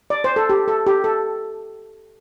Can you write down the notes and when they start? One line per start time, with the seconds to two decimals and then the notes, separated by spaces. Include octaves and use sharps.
0.10 D5
0.24 C5
0.36 A4
0.50 G4
0.68 A4
0.87 G4
1.04 A4